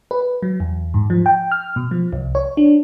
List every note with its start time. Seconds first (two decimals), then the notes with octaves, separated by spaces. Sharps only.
0.11 B4
0.43 F#3
0.60 E2
0.94 G#2
1.10 F3
1.26 G5
1.52 F6
1.76 B2
1.91 F3
2.13 C2
2.35 C#5
2.57 D4